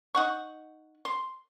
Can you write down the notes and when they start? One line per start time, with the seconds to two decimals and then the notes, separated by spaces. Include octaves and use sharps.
0.15 D#4 F#5 C#6
1.05 C6